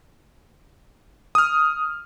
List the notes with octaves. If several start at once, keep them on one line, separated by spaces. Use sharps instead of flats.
D#6 F6